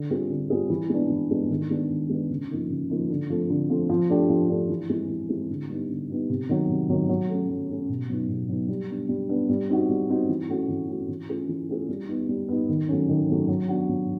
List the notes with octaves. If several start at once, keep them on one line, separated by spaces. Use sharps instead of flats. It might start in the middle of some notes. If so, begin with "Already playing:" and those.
Already playing: D3
G3 C4 F4 G#4
D3
G3 C4 F4 G#4
E3
G#3 B3 D4
E3
G#3 B3 D4
D#3
G#3 B3 D4
D#3
G#3 B3 D4
C#3
F3 A#3 D#4
C#3
F3 A#3 D#4
D3
F3 A3 C4
D3
F3 A3 C4
F3
A3 D4 G4
F3
A3 D4 G4
E3
G#3 C4 E4
E3
G#3 C4 E4
D3
G3 B3 D#4
D3
G3 B3 D#4
C3
D#3 F#3
C3
D#3 F#3
F#3
A3 C#4
F#3
A3 C#4
B2
F#3 B3 D#4
B2
F#3 B3 D#4
G3
B3 D4
G3
B3 D4
G3
C4 D#4 F#4
G3
C4 D#4 F#4
E3
A3 C#4 F#4
E3
A3 C#4 F#4
E3
A3 C#4 F4 G#4
E3
A3 C#4 F4 G#4
G3
B3 D#4
G3
B3 D#4
D#3
F#3 A3 C#4
D#3
F#3 A3 C#4
F#3
B3 D4 F#4
F#3